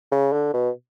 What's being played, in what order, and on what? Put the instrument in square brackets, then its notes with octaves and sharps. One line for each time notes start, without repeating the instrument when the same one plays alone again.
[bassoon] C#3
D3
B2